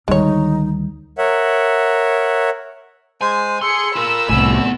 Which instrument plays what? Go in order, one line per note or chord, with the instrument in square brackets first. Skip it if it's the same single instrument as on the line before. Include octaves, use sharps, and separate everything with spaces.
[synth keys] D2 D#3 [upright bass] G3 [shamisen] G#3 C#5 [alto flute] D#4
[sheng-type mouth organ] A#4 C#5 E5 F#5
[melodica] G#3 C5 [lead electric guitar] G#5
[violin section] G#4 C#7 [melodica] A4 [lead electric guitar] C6
[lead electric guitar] F4 A#4 [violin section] B5 E6
[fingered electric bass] C2 A2 [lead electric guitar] B3 G#5